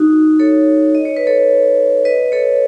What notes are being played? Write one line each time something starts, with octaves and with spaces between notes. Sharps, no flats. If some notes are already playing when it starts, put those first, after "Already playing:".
Already playing: D#4 F#4
A4 C#5
D#5
C#5
B4
A4 C#5
B4 D#5
A4 C#5